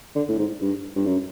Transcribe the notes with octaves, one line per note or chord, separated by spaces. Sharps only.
D3
A2
G#2
G2
G2
F#2